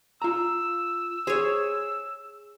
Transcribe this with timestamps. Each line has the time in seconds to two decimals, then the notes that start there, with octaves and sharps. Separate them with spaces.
0.22 F4 A#5 E6
1.27 G#4 C5 C#5